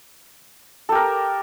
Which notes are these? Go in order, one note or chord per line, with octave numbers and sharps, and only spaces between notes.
G4 A4 A#4